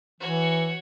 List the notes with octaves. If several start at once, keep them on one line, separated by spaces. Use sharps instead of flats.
E3 F#4 C#5